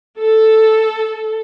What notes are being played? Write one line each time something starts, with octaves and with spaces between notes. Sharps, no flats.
A4